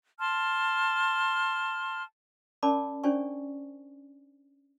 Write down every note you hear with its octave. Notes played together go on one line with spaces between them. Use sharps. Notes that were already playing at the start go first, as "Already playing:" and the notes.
A5 C6 F6
C#4 A#4 D5 A5 B5 D6
C#4 D4 C5 D5 G#5 C#6